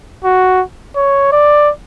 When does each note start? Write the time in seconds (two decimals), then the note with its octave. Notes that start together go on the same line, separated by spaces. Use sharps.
0.24 F#4
0.96 C#5
1.32 D5